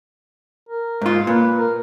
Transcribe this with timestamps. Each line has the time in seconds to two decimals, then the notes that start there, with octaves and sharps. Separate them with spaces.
0.69 A#4
1.01 G#2 F4
1.27 A#2 B4
1.58 A#4